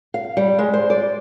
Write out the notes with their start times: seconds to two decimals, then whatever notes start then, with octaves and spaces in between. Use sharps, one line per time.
0.14 F5
0.37 G3
0.59 G#3
0.73 C5
0.90 D5